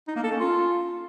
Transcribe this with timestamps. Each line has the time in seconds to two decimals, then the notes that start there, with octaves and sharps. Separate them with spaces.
0.08 D#4
0.16 A#3
0.24 A4
0.32 C#4
0.40 F4